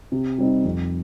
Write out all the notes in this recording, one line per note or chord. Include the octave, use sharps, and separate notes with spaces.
C3
G3 C4 D#4
F2